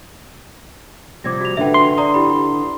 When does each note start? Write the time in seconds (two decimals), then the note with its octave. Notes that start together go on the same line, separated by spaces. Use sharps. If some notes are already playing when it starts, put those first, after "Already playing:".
1.24 C3 F3 G3 D6 G#6 A#6
1.41 F#4 F7
1.57 D3 D4 B4 E5 G5
1.74 C6
1.98 D5 A#5 D#6
2.14 E4 G4 B5